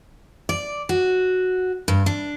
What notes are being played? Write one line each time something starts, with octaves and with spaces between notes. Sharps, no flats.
D5
F#4
G2
D4